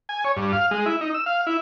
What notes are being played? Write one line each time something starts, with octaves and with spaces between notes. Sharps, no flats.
G#5
C#5
G2
F5
G#3
E4
D#4
E6
F5
E4